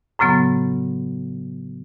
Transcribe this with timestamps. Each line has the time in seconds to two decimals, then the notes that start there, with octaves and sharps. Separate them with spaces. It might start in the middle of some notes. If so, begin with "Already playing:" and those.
0.19 F#2 A2 C#3 F#3 B3